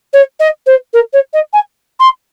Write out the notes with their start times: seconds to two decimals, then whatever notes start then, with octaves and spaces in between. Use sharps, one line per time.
0.13 C#5
0.40 D#5
0.66 C5
0.93 A#4
1.13 C#5
1.33 D#5
1.53 G#5
2.00 C6